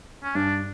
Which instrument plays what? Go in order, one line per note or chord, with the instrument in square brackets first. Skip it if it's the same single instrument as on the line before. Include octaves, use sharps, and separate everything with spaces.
[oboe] C#4
[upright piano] G2 [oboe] D4